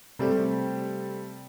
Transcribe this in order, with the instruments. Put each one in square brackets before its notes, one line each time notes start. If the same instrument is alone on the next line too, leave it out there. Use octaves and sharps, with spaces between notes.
[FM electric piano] C3 G4 [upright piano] G3 A3 C4